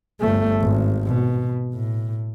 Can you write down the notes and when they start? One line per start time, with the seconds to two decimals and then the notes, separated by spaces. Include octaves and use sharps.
0.21 G1 A3
0.61 G#1
1.07 B2
1.74 A2